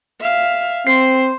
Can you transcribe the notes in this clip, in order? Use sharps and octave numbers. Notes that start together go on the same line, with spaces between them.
E5 F5
C4 C5 C7